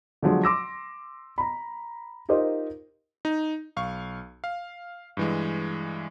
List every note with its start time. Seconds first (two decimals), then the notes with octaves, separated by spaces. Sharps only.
0.23 D3 F3 F#3 G#3
0.44 C6 D6 E6 A#6
1.38 A#5 B5
2.29 D#4 F4 G4 A#4 C5 D#5
3.25 D#4
3.76 B1 F5 C#6
4.44 F5
5.17 G2 E3 G#3